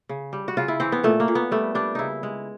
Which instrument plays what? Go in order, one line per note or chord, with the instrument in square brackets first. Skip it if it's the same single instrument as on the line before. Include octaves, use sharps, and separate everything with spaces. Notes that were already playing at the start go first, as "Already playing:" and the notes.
[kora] C#3
G3
F#4
C#3 F4
E4
E3 C4
B3
A#2 A3
A#3
A#2
B3
G3 A3
G3 D4
C#3 D#4 E4
G#3